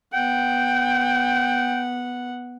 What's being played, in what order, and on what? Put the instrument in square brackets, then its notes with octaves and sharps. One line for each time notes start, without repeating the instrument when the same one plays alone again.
[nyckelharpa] B3 F#5 [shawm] G5